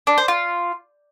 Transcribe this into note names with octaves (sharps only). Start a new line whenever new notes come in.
D4
C5
F4